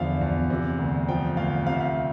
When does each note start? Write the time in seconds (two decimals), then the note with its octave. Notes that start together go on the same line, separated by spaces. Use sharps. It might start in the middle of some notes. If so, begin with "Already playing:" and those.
Already playing: E2 D3 F3 E5 F5
0.21 E2
0.50 C3
0.79 D2
1.09 F3 G5
1.37 D2 F5
1.67 C3 F5
1.73 E5
1.80 F5